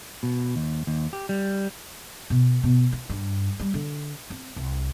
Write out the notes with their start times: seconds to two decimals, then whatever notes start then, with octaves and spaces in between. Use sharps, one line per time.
0.23 B2
0.56 D#2
0.87 D#2
1.13 G4
1.29 G3
2.30 B2
2.64 B2
2.92 F4
3.10 G2
3.60 G3
3.74 D3
4.30 C4
4.56 C2